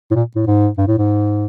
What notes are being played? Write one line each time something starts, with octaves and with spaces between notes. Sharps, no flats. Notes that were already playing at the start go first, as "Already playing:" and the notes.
A2
A#2
A2
G#2
G2
A2
G#2